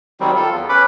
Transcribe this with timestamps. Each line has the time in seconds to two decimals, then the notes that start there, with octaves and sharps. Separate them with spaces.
0.20 D#3 F#3 G3 C4
0.36 F4 A4
0.51 E2
0.69 C#4 B4 B5 D6